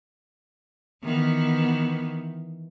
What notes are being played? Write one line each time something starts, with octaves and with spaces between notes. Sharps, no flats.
D#3 E3 B3